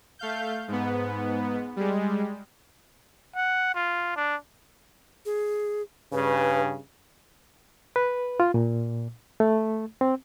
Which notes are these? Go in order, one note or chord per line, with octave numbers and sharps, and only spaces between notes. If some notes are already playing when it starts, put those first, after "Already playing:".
A3 F5 G6
G#2 B3
G3 G#3
F#5
F4
D4
G#4
G2 C#3 B4
B4
F4
A#2
A3
C4